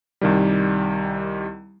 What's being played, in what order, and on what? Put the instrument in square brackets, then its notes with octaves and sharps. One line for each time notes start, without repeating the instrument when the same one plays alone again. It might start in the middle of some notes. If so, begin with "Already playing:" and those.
[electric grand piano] C2 D#3 G3